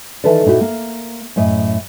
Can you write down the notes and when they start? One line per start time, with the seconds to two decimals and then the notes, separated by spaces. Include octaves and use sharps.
0.24 D#3 E3 A4 B4 D5
0.46 A#2 D#4 E4 F#4
0.61 A#3
1.36 F#2 A2 D#5